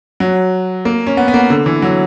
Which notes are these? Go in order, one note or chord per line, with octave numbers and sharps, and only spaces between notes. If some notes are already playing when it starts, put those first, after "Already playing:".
F#3
A#3
C#4
B3
B3
A#3
D3
E3
F#3